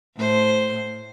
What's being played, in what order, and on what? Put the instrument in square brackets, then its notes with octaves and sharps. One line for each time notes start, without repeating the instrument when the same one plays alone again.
[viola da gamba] A2 C5